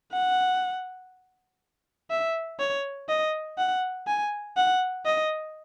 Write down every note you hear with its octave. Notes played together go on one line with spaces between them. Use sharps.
F#5
E5
C#5
D#5
F#5
G#5
F#5
D#5